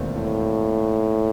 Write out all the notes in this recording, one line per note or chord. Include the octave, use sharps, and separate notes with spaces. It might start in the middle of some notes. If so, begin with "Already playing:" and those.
Already playing: E1 D#2 D#3 A3 C4
A2